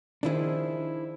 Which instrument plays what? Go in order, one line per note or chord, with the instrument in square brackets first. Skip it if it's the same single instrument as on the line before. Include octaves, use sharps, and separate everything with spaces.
[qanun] D#3 F3 G#4 [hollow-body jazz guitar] D4 E4